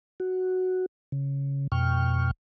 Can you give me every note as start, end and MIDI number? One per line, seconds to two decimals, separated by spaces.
0.20 0.86 66
1.12 1.67 49
1.72 2.31 41
1.72 2.31 47
1.72 2.31 79
1.72 2.31 85
1.72 2.31 89